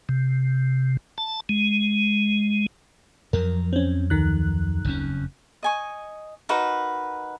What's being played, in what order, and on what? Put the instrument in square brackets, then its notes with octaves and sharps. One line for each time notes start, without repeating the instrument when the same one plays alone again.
[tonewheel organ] C3
A5
G#3
[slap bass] F2 F3 F#3 [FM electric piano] A#4
[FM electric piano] C4 C#4
D2 D#3 F#6
[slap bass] F#1 F2 C#4
[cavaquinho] D#5 G#5 C#6
D#4 F#4 A#4 B4